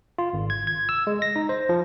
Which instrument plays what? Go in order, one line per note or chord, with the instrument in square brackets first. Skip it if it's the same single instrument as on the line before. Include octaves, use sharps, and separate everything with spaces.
[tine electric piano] F4
G#1
G#6
G#6
E6
G#3
A#6
D#4
C5
F3